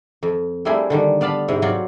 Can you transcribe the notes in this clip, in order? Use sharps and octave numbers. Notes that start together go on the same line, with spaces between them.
F2
G3 A3 A#3 C4 E4 G#4
D3 D#3 G3
B3 D5 F5 A5 B5
G#2 C3 E4
F#3 C4 F4 D5